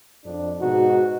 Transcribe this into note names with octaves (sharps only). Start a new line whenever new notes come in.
F2 D4
G#2 B2 D#4 F#4